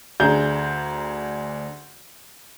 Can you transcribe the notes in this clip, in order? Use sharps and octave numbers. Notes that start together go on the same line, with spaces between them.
D2 D4 G#4 A#5 G6